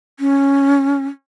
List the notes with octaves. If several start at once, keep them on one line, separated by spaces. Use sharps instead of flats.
C#4